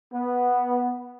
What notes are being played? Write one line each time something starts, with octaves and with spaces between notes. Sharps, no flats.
B3